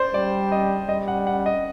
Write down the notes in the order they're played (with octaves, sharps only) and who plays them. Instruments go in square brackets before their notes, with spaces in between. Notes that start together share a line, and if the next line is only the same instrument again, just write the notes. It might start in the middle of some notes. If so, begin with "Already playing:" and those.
Already playing: [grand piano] C5 D5
[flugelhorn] G3 [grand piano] D5
[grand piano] D#5
[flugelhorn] G3 [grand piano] D#5
[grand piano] F#5
F#5
D#5